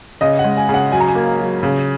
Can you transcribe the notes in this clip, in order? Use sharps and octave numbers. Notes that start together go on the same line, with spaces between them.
C#3 D#5
F#5
G#3
G#5
C#3
F#5
F#3 G#5
A#5
G#5
A#3
F#3
C#3